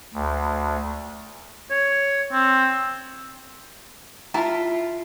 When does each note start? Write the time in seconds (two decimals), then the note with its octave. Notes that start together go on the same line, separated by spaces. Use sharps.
0.14 D2
1.71 C#5
2.32 C4
4.34 E4 F4 A5 A#5